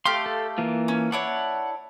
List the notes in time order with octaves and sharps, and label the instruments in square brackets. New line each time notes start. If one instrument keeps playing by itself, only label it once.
[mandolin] A3 G4 F5 [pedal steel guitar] C6
[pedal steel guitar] A4
E3 A#3 F4
[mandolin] C#4
[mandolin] D4 E4 C#5 [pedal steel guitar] F#5